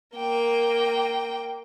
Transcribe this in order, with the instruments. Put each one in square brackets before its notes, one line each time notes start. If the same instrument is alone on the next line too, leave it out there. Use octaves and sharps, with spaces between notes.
[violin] A#3 G5